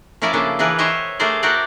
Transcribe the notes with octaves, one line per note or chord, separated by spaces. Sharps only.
F3 C#4 E4 A#4 D5
C#3 A#3 D4 A4
E3 D4 G#4 A#4 B4
C5 C#5 D#5 E5 G5
A3 D4 G#4 A#4 C5 D5
F#4 G4 A#4 D5 F#5 G5